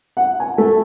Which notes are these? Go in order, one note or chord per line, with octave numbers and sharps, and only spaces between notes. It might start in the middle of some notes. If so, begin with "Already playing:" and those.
F#5
G#5
A3